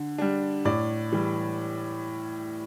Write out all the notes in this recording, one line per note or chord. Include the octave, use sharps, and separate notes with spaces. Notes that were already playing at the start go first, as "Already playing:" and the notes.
Already playing: D3
G3 D4
A2 D5
E3 G3